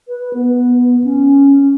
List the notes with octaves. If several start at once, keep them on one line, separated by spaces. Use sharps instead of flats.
B4
B3
C#4